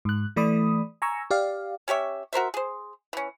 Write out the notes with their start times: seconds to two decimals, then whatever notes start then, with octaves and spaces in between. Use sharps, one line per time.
0.05 G#2 F#6
0.36 E3 A3 D5 B5 D#6
1.02 G#5 A#5 C#6 E6
1.31 G4 D5 F5
1.88 C#4 G4 C#5 E5
2.33 F#4 A#4 C5 E5
2.54 G#4 C5
3.13 E3 C#4